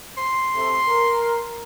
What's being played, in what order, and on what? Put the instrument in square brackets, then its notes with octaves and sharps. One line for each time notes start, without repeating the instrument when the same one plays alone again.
[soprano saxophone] C6
[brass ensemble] C3 A3
A#4